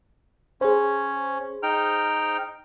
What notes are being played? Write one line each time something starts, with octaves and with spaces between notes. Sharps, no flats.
C#4 G#4 C5
D#4 G5 F6